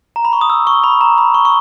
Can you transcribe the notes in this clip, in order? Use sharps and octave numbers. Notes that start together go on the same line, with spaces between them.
A#5
B5
C#6
D#6
E6
C#6
B5
A#5
B5
C#6
C#6